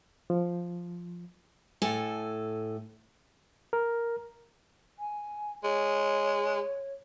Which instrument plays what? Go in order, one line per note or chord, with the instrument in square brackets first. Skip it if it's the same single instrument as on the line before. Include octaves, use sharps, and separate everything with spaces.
[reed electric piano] F3
[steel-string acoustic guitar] A2 A4 G#5
[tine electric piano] A#4
[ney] G#5
[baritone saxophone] G#3 [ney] C#5